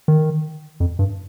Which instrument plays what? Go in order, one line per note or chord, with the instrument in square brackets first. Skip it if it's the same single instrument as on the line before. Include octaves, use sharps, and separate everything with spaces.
[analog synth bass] D#3
F2
G2